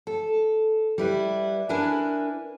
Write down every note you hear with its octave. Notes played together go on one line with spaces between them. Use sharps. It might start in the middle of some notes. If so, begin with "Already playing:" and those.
A4
G3 E4 B4
D4 E4 A#4 B4 G#5